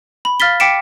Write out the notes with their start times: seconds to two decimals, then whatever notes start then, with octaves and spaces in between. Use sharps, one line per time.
0.25 B5
0.40 F5 F6 A6 B6 G7
0.60 G5 D6 B6 C#7 D7 E7